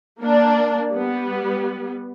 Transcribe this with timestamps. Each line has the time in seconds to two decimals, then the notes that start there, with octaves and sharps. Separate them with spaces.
0.20 A#3 D4
0.92 G3 B3